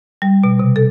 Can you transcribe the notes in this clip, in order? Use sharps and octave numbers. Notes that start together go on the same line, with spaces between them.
G3
B2
C3
A4